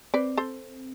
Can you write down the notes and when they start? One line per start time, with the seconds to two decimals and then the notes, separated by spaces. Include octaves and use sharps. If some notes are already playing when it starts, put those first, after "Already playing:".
0.14 C4 B4 D5
0.37 A4 C5